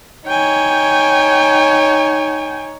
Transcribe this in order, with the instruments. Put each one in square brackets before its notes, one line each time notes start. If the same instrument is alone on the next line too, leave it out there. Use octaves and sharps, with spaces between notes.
[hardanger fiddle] D#4 C#5 [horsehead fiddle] G5 G#5